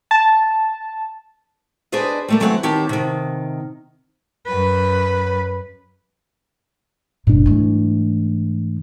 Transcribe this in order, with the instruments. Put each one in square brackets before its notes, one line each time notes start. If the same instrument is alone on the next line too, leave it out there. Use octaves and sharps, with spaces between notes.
[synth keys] A5
[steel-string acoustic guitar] D4 G#4 B4 C5 D5 D#5
G3 A3 A#3
E3 F#3 A3 C4 D5 F#5
D#3 C4 G4 C#5 A5
C3 D#3
[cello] F#2 B4
[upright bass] F#1 B2 [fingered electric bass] G#2 G3 D4
[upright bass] E3 A3